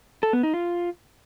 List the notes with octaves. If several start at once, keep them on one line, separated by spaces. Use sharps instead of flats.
A4
B3
D#4
F4